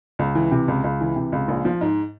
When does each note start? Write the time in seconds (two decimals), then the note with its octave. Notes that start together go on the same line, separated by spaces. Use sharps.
0.19 C#2
0.35 E3
0.51 C3
0.68 C#2
0.84 C#2
1.01 E3
1.16 C3
1.32 C#2
1.48 A#1
1.65 F3
1.81 G#2